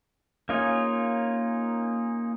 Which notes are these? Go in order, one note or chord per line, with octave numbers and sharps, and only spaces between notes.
A#3 C#4 D#4 F4 G#4